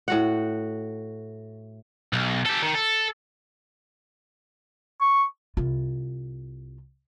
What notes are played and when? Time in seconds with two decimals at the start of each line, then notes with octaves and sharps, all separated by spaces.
0.08 A2 F#4 F#5
2.13 B1
2.46 G4 A4
2.63 D#3
2.75 A4
5.01 C#6
5.57 C2 F4